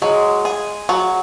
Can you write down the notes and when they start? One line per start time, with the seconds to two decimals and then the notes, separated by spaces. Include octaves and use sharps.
0.02 F#3 G#3
0.45 G#4
0.89 F#3